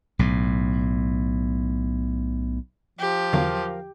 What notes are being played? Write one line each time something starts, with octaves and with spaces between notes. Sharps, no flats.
B1 A2
F3 G4
E2 D3 F#3 A#4 F5